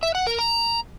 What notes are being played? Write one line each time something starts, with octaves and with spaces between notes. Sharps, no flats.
E5
F#5
A#4
A#5